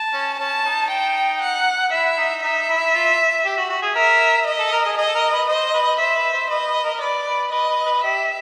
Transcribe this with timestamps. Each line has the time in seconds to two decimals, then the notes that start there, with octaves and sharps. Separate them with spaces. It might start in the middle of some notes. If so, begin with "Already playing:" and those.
Already playing: A5
0.13 C#4
0.39 C#4 A5
0.65 D#4
0.90 G5
1.41 F#5
1.92 E4 E5
2.17 D#4
2.43 D#4 E5
2.69 E4
2.95 F4
3.45 G4
3.57 F#4
3.70 F#4
3.82 G#4
3.95 A#4 E5
4.47 D#5
4.59 A4
4.73 A#4
4.85 G#4
4.97 G#4 D#5
5.08 A4
5.15 A#4
5.32 B4
5.49 C5 D#5
5.74 B4
5.99 C5 E5
6.16 B4
6.33 C5
6.50 B4 D#5
6.68 B4
6.84 A#4
6.94 A#4
7.01 B4 D5
7.26 B4
7.52 B4 D#5
7.69 B4
7.86 B4
8.03 G4 E5